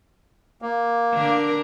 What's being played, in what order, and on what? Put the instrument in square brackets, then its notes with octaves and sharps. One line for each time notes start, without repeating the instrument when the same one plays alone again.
[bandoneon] A#3
[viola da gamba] D3 D4 A#4